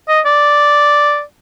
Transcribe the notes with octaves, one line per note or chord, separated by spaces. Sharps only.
D#5
D5